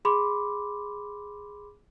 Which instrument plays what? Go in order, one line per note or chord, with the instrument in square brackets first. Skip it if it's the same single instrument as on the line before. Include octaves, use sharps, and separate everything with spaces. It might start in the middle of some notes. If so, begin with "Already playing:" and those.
[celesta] G#4 B5 C6 D6